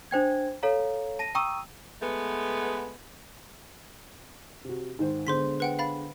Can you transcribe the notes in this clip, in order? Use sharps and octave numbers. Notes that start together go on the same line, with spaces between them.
D4 C5 G5 G#6
A4 C#5 F5 A#5
A5 A#6 D#7
G5 A#5 C#6 D#6 E6 D#7
G#3 A3 B3
C3 F#4
G#2 D#3 C5
D3 G#3 B3 C5 C6 B6
B4 F#5 G5
F5 B5 A6